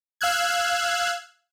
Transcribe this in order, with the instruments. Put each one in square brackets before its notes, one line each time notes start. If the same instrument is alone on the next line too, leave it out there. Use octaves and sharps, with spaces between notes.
[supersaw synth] F5 E6 F#6 G#6